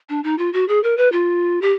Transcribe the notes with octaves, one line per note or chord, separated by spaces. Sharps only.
D4
D#4
F4
F#4
G#4
A#4
B4
F4
G4